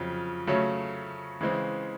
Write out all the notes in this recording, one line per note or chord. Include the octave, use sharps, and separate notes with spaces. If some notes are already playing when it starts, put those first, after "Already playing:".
Already playing: F2 C#3 F#3
C#3 F#3 A3 C#4
C#3 E3 G#3 C4